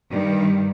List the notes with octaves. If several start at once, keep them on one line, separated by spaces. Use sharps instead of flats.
G2 D#3 G3